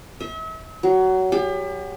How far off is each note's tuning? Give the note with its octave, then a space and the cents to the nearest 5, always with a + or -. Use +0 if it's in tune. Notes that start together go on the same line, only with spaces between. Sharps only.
E5 -40
F#3 +20
G4 +40